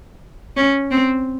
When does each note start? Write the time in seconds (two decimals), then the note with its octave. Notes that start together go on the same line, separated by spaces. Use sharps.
0.57 C#4
0.91 C4